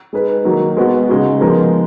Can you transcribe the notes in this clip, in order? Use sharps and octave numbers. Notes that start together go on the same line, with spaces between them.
G#3 D#4 G#4 B4
D#3 F#3 A#3 D#4
G#3 B3 F#4
C#3 G#3 D#4 F#4
F3 G#3 B3 D#4 A#4